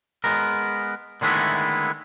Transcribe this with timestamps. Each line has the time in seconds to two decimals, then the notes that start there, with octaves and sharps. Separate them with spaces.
0.24 G#3 B3 A#4
1.21 D3 D#3 G#3 A3 B3 E4